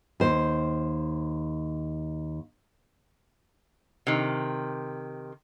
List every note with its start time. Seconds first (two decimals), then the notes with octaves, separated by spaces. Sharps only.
0.20 D#2 C5
4.07 C3 D#3